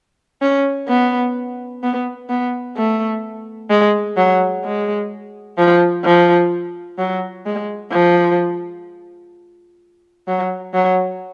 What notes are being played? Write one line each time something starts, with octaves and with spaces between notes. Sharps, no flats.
C#4
B3
B3
B3
A3
G#3
F#3
G#3
F3
F3
F#3
G#3
F3
F#3
F#3